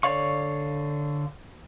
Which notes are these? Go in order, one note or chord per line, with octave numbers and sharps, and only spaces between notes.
D3 C#5 D5 F5 C#6